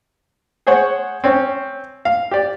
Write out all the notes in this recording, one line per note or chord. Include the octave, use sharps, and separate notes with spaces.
G#4 C5 C#5 F#5
C4 C#4
F5
G4 D5